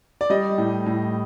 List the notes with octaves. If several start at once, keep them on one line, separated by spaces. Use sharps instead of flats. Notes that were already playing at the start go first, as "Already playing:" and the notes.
D5
G3 D#5
A2
A2